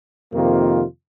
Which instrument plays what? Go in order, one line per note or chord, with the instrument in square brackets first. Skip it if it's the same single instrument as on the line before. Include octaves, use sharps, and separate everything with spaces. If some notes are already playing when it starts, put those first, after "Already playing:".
[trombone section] F2 C3 D#3 A#3 F4